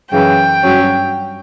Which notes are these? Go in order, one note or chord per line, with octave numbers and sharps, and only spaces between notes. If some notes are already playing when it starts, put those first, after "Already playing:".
F#2 C#3 E3 G5
G2 F#3 C#4